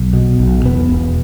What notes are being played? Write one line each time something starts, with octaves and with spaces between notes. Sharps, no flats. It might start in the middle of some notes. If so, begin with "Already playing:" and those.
Already playing: B1
B2
B1
E1 B3
E1